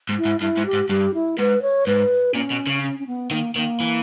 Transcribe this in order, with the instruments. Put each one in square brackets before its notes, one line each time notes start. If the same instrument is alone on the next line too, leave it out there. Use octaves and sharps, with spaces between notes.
[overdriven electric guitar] G#2
[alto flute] E4
[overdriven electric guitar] G#2
[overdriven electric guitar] G2 [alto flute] E4
[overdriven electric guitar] G#2
[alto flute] G4
[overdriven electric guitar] G#2
[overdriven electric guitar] G2 [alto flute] G4
[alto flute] E4
[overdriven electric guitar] G#2 [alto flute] B4
[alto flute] C#5
[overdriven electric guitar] G#2 [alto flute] B4
[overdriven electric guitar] A#2 [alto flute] C#4
[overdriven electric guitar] B2
C#3
[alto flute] C#4
C#4
B3
[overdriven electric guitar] D#3 [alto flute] A#3
[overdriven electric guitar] D#3 [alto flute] A#3
[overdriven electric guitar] E3